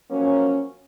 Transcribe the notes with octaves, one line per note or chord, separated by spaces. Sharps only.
F3 F#3 A#3 C#4